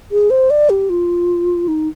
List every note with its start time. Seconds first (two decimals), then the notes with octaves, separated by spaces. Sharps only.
0.12 G#4
0.30 C5
0.50 D5
0.70 G4
0.90 F4
1.68 D#4